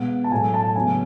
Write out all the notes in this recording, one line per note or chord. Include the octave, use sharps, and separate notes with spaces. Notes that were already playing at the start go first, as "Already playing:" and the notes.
Already playing: B2 G#3 B3 F#5
A5
A2 F#3 A3 G#5
A5
C#3 F#3 B3 G#5